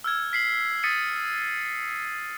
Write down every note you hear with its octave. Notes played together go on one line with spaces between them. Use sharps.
E6 F6 G#6
F6 B6 C7 F#7
D#6 A6 B6 C#7 D#7